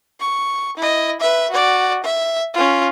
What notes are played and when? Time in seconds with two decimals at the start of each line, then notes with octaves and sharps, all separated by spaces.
0.20 C#6
0.77 E4 D#5
1.20 B4 E5
1.51 F#4 D5
2.03 E5
2.54 C#4 F4